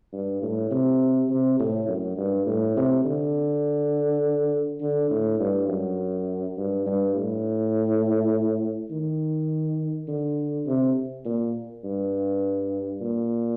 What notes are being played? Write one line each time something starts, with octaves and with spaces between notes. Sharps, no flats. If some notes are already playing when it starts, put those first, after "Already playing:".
G2
A2
C3
C3
A2
F#2
G2
A2
C3
D3
D3
A2
G2
F#2
G2
G2
A2
D#3
D3
C3
A#2
G2
A#2